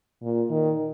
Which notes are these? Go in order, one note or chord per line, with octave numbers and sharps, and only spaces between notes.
A#2
D#3